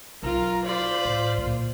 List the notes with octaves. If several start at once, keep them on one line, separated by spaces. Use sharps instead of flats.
B1 F4 A#4 A#5
F4 C5 D5 B5
A2
A#2 D3